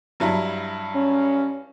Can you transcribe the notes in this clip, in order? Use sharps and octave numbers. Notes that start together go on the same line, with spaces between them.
G2 F#3 E4
C#4